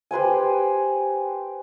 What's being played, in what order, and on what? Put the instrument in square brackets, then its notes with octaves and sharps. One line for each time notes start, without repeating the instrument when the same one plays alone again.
[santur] G4 B4 C5 G#5